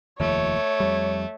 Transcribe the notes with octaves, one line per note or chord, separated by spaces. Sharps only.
F1 D#2 F3 A3 C#5
F2 G3